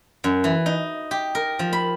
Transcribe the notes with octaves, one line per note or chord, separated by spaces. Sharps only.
F#2
E3
D#4
G4
A#4
F3
B5